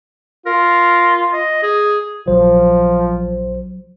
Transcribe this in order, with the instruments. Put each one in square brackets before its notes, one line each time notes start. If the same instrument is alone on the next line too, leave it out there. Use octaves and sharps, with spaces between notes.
[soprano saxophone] F4 [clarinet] A#4
[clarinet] D#5
G#4
[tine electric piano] A#1 C5 [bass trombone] F3 [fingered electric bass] F#3